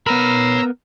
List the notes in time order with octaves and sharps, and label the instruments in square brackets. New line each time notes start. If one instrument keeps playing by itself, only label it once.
[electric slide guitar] B3 A#4 [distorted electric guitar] C#5 B5 [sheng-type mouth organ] A#5 E6